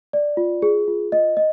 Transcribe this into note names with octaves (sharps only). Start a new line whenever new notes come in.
D5
F4
G#4
F4
D#5
D#5